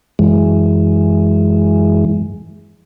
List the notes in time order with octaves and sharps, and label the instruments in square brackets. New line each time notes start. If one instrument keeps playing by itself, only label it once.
[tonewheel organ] F#2 E3 G#3